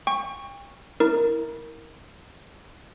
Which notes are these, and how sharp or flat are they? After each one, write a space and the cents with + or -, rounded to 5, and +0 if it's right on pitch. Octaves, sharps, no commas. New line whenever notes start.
G5 +35 C#6 +0
E4 -25 A#4 +0